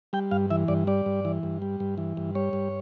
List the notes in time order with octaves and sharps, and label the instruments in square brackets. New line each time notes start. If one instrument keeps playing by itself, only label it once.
[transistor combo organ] G3 G5
G2 F5
E3 E5
G2 D5
G3 D5
G2
E3
G2
G3
G2
E3
G2
G3 C#5
G2